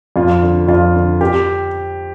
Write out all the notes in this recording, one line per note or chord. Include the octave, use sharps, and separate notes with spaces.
F2 F4
D3
F2 F4
D3
G4